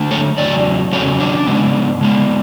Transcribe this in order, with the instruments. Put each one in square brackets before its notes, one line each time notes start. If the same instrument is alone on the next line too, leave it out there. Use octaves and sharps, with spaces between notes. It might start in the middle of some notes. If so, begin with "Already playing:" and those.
Already playing: [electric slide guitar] D3 A3 D4
A4 C#5
E2 C#3 F#3 D5
E2 C#3 F#3 C#4 A4 C#5
D4
C#3 G#3 B3
C#3 G#3 B3